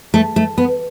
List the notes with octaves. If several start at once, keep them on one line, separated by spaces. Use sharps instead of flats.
A3
A3
B3